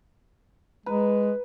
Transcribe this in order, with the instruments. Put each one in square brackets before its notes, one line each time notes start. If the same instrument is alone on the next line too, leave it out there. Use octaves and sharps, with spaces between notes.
[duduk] G#3 [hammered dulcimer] B4